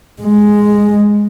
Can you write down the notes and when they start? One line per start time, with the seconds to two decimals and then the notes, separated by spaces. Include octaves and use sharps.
0.22 G#3